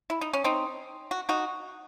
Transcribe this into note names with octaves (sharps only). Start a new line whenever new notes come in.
E4
D#4
C#4
C4 D#4
F#4
D#4 F#4